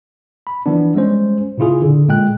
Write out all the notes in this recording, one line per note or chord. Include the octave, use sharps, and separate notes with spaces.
B5
E3 F3 B3 D4
G3 G#3 C#4 C5
A#2 C#3 E4 F4 G#4
D3
A#2 G#3 G5 F#6